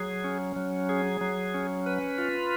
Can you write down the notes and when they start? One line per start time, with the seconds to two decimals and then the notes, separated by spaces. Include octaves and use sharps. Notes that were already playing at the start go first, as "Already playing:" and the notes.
Already playing: F#3 G#4
0.24 C#4
0.56 F#3
0.89 G#4
1.21 F#3
1.54 C#4
1.86 B4
2.18 F4